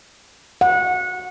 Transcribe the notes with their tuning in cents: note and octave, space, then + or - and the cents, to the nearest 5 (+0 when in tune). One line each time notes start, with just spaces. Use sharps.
F#5 -20